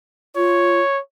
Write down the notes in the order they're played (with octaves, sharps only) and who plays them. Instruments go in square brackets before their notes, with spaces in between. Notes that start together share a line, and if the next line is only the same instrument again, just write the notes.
[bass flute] F4 [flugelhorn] C#5